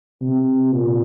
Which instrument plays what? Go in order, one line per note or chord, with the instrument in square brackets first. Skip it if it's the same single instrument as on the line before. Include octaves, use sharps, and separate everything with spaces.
[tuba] C3
A#2